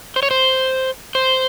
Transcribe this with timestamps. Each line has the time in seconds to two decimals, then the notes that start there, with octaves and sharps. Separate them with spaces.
0.16 C5
0.23 C#5
0.31 C5
1.15 C5